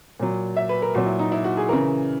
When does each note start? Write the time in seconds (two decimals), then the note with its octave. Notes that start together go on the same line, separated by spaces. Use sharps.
0.20 A#2 F#3
0.56 E5
0.69 B4
0.82 A#4
0.95 A#2 F#3 F#4
1.06 E4
1.19 D#4
1.32 E4
1.44 F#4
1.57 G#4
1.69 C#3 E3 A#4